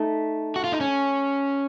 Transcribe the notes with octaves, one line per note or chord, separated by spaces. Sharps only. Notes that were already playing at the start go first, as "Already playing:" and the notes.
Already playing: A3 D#4
F#4
F4
D#4
C#4